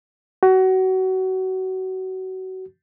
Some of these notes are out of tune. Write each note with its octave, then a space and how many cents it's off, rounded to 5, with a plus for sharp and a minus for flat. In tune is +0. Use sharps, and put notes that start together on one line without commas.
F#4 +25